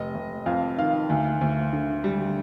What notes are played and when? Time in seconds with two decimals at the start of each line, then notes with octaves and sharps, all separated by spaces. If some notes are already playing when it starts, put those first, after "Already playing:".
Already playing: F1 D#5
0.15 F1
0.46 F2 F5
0.78 D#3 F5
1.10 D2
1.41 D2
1.73 D3
2.04 G3